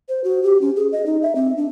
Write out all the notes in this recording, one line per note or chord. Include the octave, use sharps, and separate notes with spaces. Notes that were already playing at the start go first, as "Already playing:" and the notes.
C5
F#4
G4
C#4
G#4
D#5
D#4
E5
C4
D4